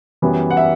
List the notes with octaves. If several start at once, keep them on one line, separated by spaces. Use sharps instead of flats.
F#2 E3 G3 B3
F#5
E5